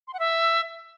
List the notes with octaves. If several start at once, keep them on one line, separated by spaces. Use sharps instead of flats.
C6
F#5
E5